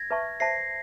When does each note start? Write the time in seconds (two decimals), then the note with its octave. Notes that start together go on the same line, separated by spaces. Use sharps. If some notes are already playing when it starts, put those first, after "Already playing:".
Already playing: G#6 A#6
0.11 B4 E5 A5 C#6
0.40 C5 E5 A5 A#6 C7